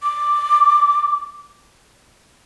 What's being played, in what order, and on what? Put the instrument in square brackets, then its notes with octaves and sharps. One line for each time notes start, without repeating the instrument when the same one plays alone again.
[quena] D6